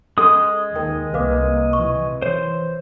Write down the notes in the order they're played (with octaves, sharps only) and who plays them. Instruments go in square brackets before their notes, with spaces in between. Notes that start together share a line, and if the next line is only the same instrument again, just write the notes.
[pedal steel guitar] G#3 D#6 [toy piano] C#4 A4 C6
[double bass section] D#2 [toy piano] D#4 A#4 G5
[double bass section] C2 A#3 [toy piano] B4 F5 D6
[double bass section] C3 E3 [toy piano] C#6
[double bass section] E3 [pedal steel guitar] C5 [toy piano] C#5